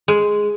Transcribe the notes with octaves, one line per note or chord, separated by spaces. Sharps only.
G#3